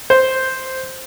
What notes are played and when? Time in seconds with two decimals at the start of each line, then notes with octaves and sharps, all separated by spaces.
0.10 C5